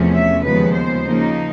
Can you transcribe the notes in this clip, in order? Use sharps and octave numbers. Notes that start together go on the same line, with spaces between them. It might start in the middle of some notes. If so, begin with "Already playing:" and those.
Already playing: E2 C3 F3 A3 C#4
E5
D#2 C#3 F3 G#3 B3 B4
C5
C#3 F3 A#3 D#4